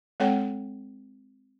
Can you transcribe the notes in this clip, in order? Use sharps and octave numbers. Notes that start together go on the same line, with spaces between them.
G#3 C4 A4 C#5 F#5 G5